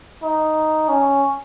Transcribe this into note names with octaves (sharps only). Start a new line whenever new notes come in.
D#4
C#4